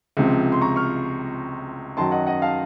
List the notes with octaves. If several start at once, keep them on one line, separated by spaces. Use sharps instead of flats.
C#2 C3 F3
C6
A#5 C#6
C#6 F6
F#2 D#3 F#3 A5 C6
D#5 F#5
D#5 F#5
F5 A5